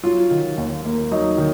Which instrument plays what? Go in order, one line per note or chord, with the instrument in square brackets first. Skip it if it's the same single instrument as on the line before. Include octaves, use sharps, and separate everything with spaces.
[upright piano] F#3 [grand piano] F4
[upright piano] D#3
D#2
A#3
[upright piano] F#3 [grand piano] D#4
[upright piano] D#3